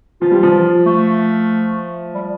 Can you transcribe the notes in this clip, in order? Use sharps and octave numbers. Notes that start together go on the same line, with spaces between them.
F3 F4
G3
F3
A3
G3